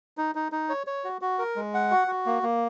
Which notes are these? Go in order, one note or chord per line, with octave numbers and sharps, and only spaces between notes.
D#4
D#4
D#4
C#5
C#5
F#4
F#4
A#4
G#3
F#5
F#4
F#4
A#3
A#3